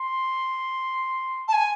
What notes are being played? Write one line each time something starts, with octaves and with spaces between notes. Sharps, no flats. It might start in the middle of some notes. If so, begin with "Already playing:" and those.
Already playing: C6
A5
G#5